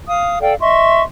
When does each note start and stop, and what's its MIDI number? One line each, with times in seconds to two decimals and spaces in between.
0.07 0.39 77
0.07 0.39 87
0.41 0.54 69
0.41 0.54 74
0.41 0.54 77
0.41 0.54 79
0.60 1.02 75
0.60 1.02 76
0.60 1.02 84
0.60 1.02 85